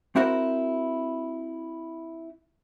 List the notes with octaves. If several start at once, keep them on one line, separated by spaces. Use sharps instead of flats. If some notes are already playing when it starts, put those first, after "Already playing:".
C4 E4 F#4 A#4 C5